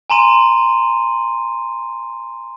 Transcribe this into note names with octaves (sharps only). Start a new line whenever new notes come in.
G#5 A#5 C6 D#7